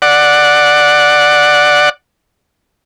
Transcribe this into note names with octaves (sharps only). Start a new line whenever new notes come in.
D5 F#5